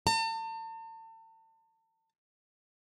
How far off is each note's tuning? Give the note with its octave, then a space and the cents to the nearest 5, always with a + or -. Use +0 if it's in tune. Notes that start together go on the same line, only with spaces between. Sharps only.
A5 +40